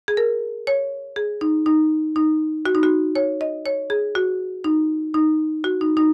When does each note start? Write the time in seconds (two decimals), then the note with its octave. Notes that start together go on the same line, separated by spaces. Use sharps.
0.08 G#4
0.17 A#4
0.67 C#5
1.16 G#4
1.41 D#4
1.66 D#4
2.16 D#4
2.66 F#4
2.75 D#4
2.83 F#4
3.16 C#5
3.41 D#5
3.66 C#5
3.90 G#4
4.15 F#4
4.64 D#4
5.14 D#4
5.64 F#4
5.81 D#4
5.97 D#4